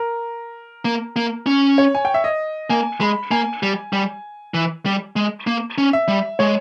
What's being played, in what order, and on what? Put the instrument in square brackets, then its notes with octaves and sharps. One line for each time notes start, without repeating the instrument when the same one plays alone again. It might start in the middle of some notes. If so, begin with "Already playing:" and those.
Already playing: [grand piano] A#4
[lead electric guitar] A#3
A#3
C#4
[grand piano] C#5
G#5
G5
E5
D#5
[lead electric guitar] A#3 [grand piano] G#5
[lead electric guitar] G#3 [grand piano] B5
[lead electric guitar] A#3 [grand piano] G#5
[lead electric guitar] G3
G3
E3
G3
G#3
A#3
C#4
[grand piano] E5
[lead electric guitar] G3
[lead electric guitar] G#3 [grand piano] C#5